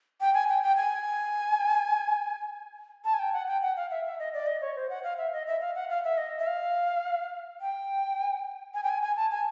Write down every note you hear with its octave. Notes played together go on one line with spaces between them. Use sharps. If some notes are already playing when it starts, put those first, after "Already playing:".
G5
G#5
G5
G5
G#5
A5
G#5
G5
F#5
G5
F#5
F5
E5
E5
D#5
D5
D#5
C#5
C5
F#5
F5
E5
D#5
E5
F5
F#5
F5
E5
D#5
E5
F5
G5
G#5
G5
G#5
G#5
A5
G#5